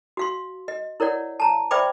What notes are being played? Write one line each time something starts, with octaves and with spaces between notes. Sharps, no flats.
F#4 F5 C6
D#5
E4 A#4 C#5 D5 F#5
A5 A#5
C5 D5 E5 G5 B5 D6